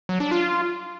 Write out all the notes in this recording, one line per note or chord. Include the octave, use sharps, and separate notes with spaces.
F#3
D4
F4